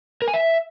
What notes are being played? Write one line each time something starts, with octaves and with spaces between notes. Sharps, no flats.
A#4
G#5
E5